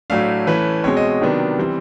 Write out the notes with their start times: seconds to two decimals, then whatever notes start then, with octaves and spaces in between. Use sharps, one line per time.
0.10 A2 F#3 A3 D4 F5
0.47 E3 A3 C#4 B4
0.84 B2 G#3 C4 C#5
0.97 D#5
1.21 C3 D#3 F#3 B3 D4
1.58 E3 G3 C4